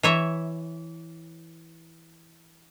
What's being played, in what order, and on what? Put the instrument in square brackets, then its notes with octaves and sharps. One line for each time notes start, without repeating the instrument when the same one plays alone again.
[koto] E3 C#5 E5